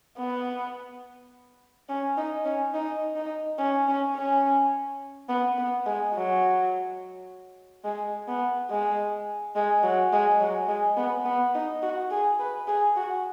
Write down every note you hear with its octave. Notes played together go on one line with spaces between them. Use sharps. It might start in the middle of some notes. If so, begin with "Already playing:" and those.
B3
C#4
D#4
C#4
D#4
D#4
C#4
C#4
C#4
B3
B3
G#3
F#3
G#3
B3
G#3
G#3
F#3
G#3
F#3
G#3
B3
B3
D#4
F#4
G#4
B4
G#4
F#4